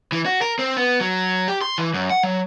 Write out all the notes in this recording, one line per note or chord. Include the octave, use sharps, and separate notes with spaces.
E3
F#4
A#4
C4
B3
F#3
G4
C6
E3
F#2
F#5
F#3